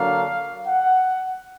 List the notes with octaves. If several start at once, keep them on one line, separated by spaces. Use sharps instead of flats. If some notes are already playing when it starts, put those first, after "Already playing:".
Already playing: D3 F#3 A#3 D4 F5
F#5